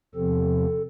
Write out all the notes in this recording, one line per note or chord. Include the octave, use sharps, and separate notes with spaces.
E2 C3 F3 C4 A4